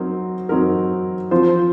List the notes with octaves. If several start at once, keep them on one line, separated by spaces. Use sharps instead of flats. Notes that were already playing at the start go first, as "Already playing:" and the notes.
Already playing: F#3 C4 D#4 A#4
F#3 C4 D#4 A#4
F3 C4 F4 C5